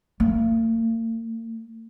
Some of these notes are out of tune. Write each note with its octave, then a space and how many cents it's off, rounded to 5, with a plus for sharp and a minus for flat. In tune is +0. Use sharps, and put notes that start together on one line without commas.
A#3 -45